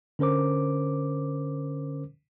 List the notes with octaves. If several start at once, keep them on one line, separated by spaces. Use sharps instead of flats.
D3 C#4 A#4 C5 D6